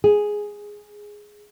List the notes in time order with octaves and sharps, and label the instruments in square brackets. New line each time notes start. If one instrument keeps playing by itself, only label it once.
[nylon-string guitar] G#4